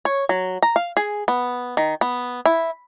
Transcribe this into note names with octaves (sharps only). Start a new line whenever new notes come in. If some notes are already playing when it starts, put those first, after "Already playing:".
C#5
F#3
A#5
F5
G#4
B3
D#3
B3
E4